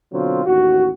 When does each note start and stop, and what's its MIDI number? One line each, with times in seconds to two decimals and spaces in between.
0.12 0.41 47
0.12 0.41 50
0.12 0.41 54
0.12 0.41 60
0.12 0.41 65
0.46 0.89 33
0.46 0.89 39
0.46 0.89 66